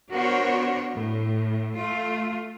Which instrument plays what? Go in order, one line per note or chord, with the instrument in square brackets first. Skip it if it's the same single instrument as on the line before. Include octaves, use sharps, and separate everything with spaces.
[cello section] B3 D4 F#4 A#4 C5 C#5
A2
A3 F4